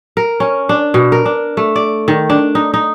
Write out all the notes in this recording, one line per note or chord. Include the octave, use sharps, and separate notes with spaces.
A#4
C#4
D4
B2
A#4
D4
A3
D5
D#3
D4
D#4
D#4